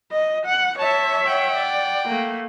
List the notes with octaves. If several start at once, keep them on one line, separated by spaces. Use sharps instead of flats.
D#5
F#5
C#5 E5 A5
F#5 G5
D5
A3 A#3